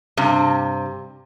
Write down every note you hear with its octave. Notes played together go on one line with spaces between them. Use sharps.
G2 C3